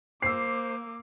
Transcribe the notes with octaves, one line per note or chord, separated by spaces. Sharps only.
A#3 C5 D6 E6 C7